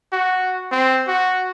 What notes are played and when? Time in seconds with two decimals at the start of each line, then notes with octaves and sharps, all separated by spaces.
0.13 F#4
0.71 C4
1.08 F#4